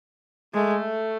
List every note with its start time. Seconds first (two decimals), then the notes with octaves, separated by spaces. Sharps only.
0.54 G#3 A3